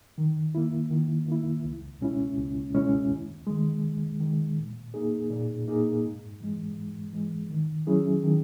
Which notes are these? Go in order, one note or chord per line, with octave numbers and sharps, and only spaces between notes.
D#3
A#3 E4
D#3
A#3 E4
C#2
B2 G#3 C#4 E4
C#2
B2 G#3 C#4 E4
D#2
D#3 G#3
D#2
D#3 G#3
A#2
A#3 D#4 G#4
A#2
A#3 D#4 G#4
G#2
E3 G#3
G#2
E3 G#3
D#3
F#3 C#4 E4 G#4
D#3